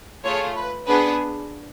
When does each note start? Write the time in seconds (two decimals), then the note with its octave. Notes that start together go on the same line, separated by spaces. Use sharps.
0.25 A3 F4 G#4 C#5
0.56 B4
0.88 B3 D4 G#4 B4